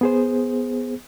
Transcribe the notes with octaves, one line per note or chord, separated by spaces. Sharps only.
B3 G#4 C5